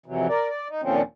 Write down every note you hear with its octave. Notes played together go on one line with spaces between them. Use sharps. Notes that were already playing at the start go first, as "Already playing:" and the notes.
F2 C3 E3 F#3
A#4 D5
D5
D#4
D#2 A#2 D3 F3 C4 C#4